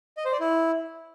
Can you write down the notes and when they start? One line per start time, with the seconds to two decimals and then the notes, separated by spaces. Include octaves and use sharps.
0.17 D#5
0.25 C5
0.32 D5
0.40 E4